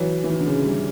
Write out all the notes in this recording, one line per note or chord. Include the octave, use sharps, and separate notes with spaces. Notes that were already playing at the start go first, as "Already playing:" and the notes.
Already playing: E3 F#3
E3
D#3
D3
C#3
G3